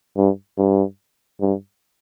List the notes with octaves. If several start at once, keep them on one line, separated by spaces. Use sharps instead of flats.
G2
G2
G2